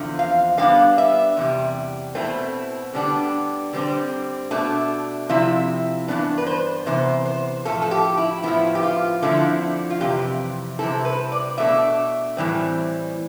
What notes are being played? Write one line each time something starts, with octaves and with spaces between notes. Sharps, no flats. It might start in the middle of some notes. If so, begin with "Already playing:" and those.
Already playing: E2 D3 F3 C4
F5
D3 G3 B3 D4 F5
E5
E2 C3 G3
B2 A3 C4 E4
D3 G3 B3 D4
D3 G3 C4
B2 A3 D4
C3 F3 C4 E4 E5
G2 E3 B3 D4
B4
C5
C3 E3 B3 C5
C5
A2 F3 A3 A4
A4
G4
E4
A2 F3 B3 E4
G4
F4
D3 F3 A3 C4 E4
F4
F2 C3 E3 G4
C3 G3 C4 E4 A4
B4
D5
B2 A3 D4 E5
A2 E3 G3 C4